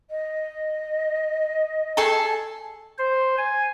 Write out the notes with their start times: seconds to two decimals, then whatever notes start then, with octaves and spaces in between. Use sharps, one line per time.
0.10 D#5
1.97 G#4 A4 A5
2.99 C5
3.38 G#5